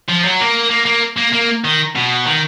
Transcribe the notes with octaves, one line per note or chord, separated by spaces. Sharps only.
F3
F#3
A#3
A#3
A#3
A#3
A#3
D#3
B2
D#3